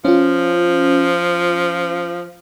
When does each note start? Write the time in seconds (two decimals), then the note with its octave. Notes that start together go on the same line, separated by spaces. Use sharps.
0.05 F3 C#4 F4